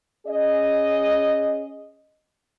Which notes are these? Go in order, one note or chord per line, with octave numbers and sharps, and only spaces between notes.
C#4 G#4 D#5